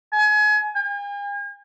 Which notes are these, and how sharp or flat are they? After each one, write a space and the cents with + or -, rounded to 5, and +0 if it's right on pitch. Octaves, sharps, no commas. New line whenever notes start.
G#5 +30
G#5 -45